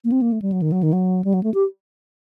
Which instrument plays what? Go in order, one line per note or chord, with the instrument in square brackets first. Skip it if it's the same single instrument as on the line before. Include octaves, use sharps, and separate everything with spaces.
[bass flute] A#3
C4
A#3
A3
G3
F#3
D#3
F#3
D#3
F#3
G3
F#3
A3
G4